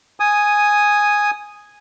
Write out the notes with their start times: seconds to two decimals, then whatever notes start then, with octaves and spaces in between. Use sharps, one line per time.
0.20 G#5 D#6